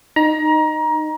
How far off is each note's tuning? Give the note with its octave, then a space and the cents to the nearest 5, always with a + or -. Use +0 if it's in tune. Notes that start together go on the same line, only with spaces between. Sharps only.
D#4 -15 A#5 +25